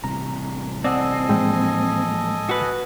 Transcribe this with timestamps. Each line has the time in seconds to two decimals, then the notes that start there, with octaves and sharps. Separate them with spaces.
0.04 A1 C3 G3 A#5
0.84 C4 A4 D5 D#5 F#5 G#5
1.29 A2 E3 F3 G#3 A#3 G5
2.49 F#4 B4